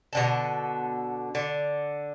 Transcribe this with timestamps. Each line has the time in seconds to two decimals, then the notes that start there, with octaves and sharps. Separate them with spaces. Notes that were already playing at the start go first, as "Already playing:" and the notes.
0.13 B2 D3 A4
1.35 D3